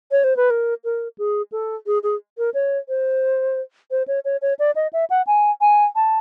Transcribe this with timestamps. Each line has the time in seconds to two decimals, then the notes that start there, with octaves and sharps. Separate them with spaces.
0.12 C#5
0.24 C5
0.37 B4
0.50 A#4
0.84 A#4
1.18 G#4
1.52 A4
1.87 G#4
2.03 G#4
2.38 A#4
2.54 C#5
2.89 C5
3.91 C5
4.08 C#5
4.25 C#5
4.42 C#5
4.59 D5
4.76 D#5
4.93 E5
5.10 F#5
5.27 G#5
5.61 G#5
5.96 A5